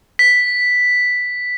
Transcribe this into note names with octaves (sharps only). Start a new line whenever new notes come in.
B6